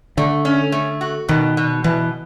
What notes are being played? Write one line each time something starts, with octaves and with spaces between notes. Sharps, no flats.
D3 A3
C#4
A3
F#4
B2 D#3
B2
B2 E3